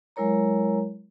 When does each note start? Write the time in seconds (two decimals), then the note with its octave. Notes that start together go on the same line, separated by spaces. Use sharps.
0.16 F#3 G#3 E4 A#4 C#5 A#5